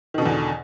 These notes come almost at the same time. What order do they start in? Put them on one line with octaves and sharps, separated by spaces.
D#3 B2 D3 E2